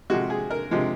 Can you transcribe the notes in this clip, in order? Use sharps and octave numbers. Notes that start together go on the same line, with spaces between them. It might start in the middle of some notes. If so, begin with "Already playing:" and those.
C3 F3 G#3 F#4
G#4
A#4
C3 F3 G#3